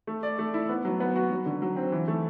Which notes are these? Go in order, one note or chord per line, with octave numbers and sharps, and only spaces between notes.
A3
D5
A3
E4
B3
F#3
B3
F#4
F#3
D3
F#3
C4
E3
A3